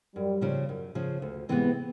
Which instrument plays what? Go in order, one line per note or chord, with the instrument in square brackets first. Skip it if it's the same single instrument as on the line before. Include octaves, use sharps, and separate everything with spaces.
[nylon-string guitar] F#2 [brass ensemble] G3
[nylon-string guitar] C#3 F3
F#2
C#3 F3
D2
C3 E3 G#3 B3